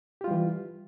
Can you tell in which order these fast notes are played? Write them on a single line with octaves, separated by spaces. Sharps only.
G4 F4 G3 E3